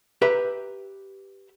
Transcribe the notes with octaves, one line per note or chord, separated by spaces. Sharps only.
G4 B4 E5 A#5